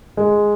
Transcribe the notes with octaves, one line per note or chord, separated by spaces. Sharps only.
G#3